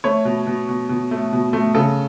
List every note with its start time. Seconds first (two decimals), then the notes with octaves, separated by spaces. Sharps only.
0.04 A3 C#5
0.25 B2
0.47 B2
0.69 B2
0.89 B2
1.11 A3
1.32 B2
1.53 A3
1.74 C#3 A4